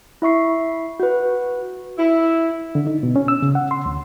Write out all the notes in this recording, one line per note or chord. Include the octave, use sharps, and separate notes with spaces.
E4 E5 C#6 C7
F#4 B4
E4
D3
D#4
B2
C#4
E6
C#3
F#5
C6
D2